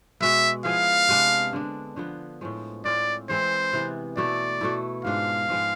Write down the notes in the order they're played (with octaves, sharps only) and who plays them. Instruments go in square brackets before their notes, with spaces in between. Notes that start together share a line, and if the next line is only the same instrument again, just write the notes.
[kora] B2 G#3 B3 [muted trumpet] E5
[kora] F3 B3 E4 G#4 [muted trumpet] F5
[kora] C3 G#3 B3 D4
D3 G#3 D4
D3 F3 B3
A2 F3 G#3
[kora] A2 G#3 C4 F4 [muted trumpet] D5
[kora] E3 G#3 C4 E4 [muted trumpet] C5
[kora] C3 E3 B3
[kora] B2 A3 E4 [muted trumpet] D5
[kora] B2 A3 E4
[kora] G#2 G#3 D4 F4 [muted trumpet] F5
[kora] G#2 F3 G#3 B3